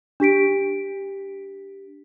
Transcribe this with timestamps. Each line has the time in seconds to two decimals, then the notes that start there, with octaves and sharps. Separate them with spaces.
0.20 D4 G4 B6 D7